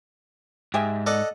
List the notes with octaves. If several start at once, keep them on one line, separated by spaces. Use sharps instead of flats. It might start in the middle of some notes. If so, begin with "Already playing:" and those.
G#2 G4 G#4 E5
A4 D5 D#5 F#5